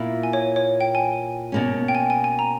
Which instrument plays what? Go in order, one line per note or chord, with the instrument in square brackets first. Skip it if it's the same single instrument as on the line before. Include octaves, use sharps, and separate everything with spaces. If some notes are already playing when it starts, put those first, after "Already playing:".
Already playing: [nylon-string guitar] A#2 A#3 E4
[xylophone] G#5
C#5
C#5
G5
G#5
[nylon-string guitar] B2 A#3 C#4
[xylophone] G5
G#5
G#5
G#5
A#5